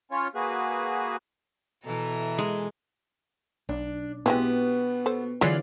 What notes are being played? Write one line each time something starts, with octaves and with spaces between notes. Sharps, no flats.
C#4 F4 C#5
A#3 F#4 G#4 B4
B2 E3 E4 A4 A#5
G#3
B1 D4
B2 G#3 B3 C4 E4 G4
A4 C5
D3 E3 F#3 G#3 E4 F4 D5 F5